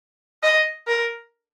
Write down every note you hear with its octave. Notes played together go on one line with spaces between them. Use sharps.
D#5
A#4